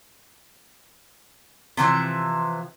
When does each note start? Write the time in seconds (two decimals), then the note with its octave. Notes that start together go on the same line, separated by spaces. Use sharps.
1.77 C3 E3 F3 E5